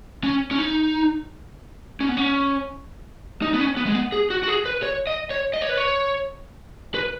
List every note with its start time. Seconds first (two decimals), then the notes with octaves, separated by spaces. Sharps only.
0.24 C#4
0.51 C#4
0.59 D#4
2.01 C#4
2.09 B3
2.17 C#4
3.42 D#4
3.54 B3
3.60 C#4
3.77 B3
3.86 G#3
3.95 B3
4.12 G#4
4.30 F#4
4.43 F#4
4.48 G#4
4.66 B4
4.83 C#5
5.07 D#5
5.30 C#5
5.54 D#5
5.61 C#5
5.69 B4
5.77 C#5
6.95 B4